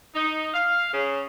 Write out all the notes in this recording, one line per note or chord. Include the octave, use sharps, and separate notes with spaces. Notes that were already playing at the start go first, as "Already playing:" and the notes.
D#4
F5
C#3